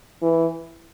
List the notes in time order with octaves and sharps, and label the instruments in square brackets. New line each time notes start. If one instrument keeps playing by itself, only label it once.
[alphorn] E3